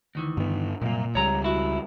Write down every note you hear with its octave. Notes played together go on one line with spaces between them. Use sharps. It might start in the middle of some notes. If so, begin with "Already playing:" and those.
D2 D#3 E3
G2 B3
C2 F#2 A#2 A#3
C#2 G3 C#5 A#5
E4 F#4